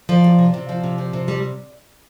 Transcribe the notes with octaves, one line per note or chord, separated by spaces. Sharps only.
F3 D5
C3
C3
C3
F3
C3
F3
C3
G3